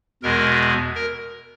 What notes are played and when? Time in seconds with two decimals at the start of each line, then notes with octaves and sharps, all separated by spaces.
0.23 E2 B2 G#3 A#4
0.95 A#4